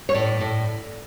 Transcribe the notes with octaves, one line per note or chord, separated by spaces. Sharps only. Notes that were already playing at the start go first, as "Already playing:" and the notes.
C#5
A2 D5
A2